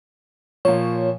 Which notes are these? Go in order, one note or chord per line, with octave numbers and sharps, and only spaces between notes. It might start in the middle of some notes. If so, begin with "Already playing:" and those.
A#2 F3 C#5